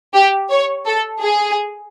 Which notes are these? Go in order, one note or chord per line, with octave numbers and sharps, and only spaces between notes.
G4
C#5
A4
G#4